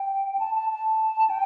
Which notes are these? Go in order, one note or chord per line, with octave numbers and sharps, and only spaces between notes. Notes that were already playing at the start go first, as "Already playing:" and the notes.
Already playing: G5
A5
A5
A5
G5